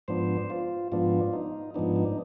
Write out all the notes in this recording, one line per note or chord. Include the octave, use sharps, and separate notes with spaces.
G#2 F3 B3 D4 C5
F4
G#2 F3 B3 D4 F4
D#4
G#2 F3 B3 D4 D#4
D#4